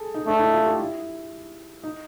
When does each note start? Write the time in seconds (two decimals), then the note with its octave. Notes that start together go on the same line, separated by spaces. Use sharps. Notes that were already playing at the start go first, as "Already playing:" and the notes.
Already playing: G#4 A4
0.14 D#4
0.26 A3 D4
0.39 E4
0.53 F4
0.65 G4
0.78 E4
1.83 D#4